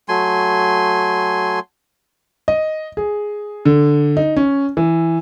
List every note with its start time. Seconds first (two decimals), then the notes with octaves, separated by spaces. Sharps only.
0.09 F#3 A3 G#5 C6
2.48 D#5
2.97 G#4
3.65 D3
4.17 D#4
4.36 C#4
4.77 E3